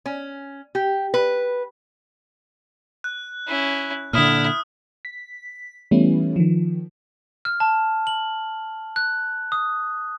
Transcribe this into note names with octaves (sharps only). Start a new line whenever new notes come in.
C#4
G4
B4
F#6
C#4 E4
A#2 D3 E4 D#6 F6
B6
E3 G3 A3 B3 C#4 E4
D#3 F3
F6
A5
F#7
F#6
D#6